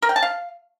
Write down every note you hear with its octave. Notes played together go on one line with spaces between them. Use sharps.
A#4
G5
A5
F5